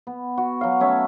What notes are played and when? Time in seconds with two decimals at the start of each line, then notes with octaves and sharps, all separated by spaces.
0.07 B3
0.37 F#4
0.61 F#3 F5
0.80 A3 C#4 E5